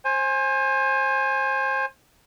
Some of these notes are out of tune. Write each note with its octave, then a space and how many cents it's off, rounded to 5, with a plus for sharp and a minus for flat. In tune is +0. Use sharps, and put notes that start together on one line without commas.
C5 +30 G#5 +0